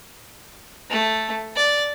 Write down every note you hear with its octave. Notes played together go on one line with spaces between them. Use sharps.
A3
D5